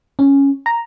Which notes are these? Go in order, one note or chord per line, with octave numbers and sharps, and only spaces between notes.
C#4
A#5